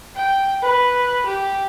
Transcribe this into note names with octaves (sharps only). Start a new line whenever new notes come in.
G5
B4
G4